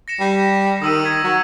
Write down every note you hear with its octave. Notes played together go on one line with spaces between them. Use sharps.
A#6 C#7 E7
G3
D#3 D#6 E6 D#7
G#6 B6
F#3